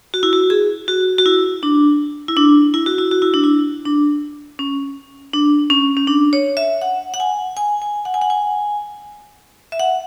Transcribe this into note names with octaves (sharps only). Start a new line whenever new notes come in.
F#4
E4
F#4
G#4
F#4
F#4
E4
D4
E4
D4
E4
F#4
E4
F#4
E4
D4
E4
D4
C#4
D4
C#4
C#4
D4
C#5
E5
F#5
F#5
G#5
G#5
G#5
F#5
G#5
F#5
G#5
E5
F#5